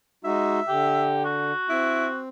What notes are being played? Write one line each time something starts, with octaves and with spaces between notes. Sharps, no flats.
G#3 D#4 F#4 E5
D3 G4
F#4
C4 E4